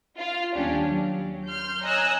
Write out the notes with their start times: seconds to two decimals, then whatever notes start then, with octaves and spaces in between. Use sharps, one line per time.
0.18 F4 F5
0.55 D#2 G3 C#4 D4 G4
0.86 F#3
1.48 C6 F6 G6
1.82 C#5 D#5 G#5 A#5 E6 F#6